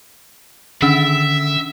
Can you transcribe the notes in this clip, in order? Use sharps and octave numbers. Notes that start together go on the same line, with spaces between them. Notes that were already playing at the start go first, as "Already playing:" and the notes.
D3 D#3 C#4 D4 E5